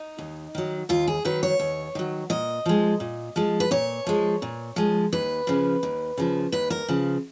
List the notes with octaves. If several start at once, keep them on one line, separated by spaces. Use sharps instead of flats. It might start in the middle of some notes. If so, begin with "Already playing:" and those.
Already playing: D#4
D#2
D#3 F#3
D#2 F4
G#4
D#3 F#3 B4
C#5
D#2
D#3 F#3
A#2 D#5
F3 G#3
A#2
F3 G#3
B4
A#2 C#5
F3 G#3
A#2
F3 G#3
D#2 B4
C#3 F3
D#2
C#3 F3
D#2 B4
A#4
C#3 F3